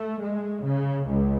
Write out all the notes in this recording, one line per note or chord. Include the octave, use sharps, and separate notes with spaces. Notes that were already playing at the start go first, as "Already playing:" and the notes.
Already playing: A3
G#3
C#3
C#2